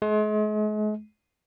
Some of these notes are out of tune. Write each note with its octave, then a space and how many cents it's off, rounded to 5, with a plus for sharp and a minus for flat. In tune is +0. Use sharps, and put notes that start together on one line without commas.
G#3 +40